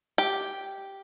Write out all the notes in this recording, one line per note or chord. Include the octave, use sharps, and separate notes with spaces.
G4